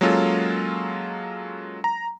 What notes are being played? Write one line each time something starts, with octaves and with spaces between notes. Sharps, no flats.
F#3 G#3 A#3 C#4 F4 A4
A#5